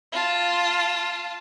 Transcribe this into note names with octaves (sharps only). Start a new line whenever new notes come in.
F4 A5